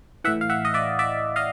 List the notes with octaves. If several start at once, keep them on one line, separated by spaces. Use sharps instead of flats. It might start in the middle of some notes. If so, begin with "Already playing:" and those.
A2 E3 E5 F#5
F5
E5 F#5
D#5
D5 E5
D5 E5
D#5 F5